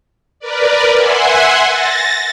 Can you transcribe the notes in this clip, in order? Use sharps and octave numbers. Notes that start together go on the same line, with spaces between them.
A#4 B4 D5
E5 F#5 G#5 C6
A6 A#6